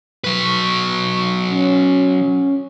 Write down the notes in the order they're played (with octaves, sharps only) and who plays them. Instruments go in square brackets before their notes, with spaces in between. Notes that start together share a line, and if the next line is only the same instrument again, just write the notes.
[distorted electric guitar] F#3 B4 [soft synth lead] C#6
[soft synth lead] C#4